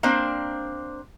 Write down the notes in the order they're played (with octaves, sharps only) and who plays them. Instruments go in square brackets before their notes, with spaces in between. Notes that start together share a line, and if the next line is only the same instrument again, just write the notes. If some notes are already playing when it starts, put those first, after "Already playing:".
[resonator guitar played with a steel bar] A#3 C4 D4 C5